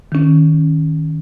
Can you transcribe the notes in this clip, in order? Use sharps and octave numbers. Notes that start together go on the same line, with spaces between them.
D#3 C#4